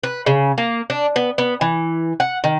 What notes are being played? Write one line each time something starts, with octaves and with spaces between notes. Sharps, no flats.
B4
C#3
A#3
D4
B3
B3
E3
F#5
D#3